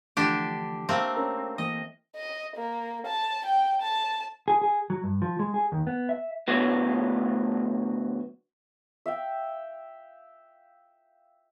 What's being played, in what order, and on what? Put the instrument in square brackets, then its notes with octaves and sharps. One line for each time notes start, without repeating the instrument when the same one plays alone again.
[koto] D3 D4 G4 [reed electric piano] E3 F3 A3
[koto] A3 A#3 C4
[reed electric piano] C#4 A#4 A#5
[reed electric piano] E3 A#3 [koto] D#5
[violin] D#5
A#3
A5
G5
A5
[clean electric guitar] G#4
G#4
F#3
G2
F3
G#3
G#4
D#2
B3
E5
D2 A2 F#3 B3
[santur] E5 F5 G5